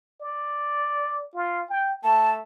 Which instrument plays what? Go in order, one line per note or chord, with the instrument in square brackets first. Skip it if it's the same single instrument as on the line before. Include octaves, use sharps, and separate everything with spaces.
[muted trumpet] D5
F4
G5
[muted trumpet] A3 [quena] A5